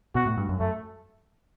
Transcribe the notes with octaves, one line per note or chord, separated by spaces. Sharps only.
B2 F#4
A2
G2
F#2
F#2 A3